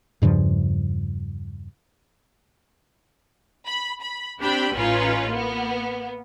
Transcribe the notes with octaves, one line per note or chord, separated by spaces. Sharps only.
E2 G2 C#3 F3
B5
B5
C4 D4 G4 G5 B5
A1 C#4 D#4 F4 B4
A#3 B3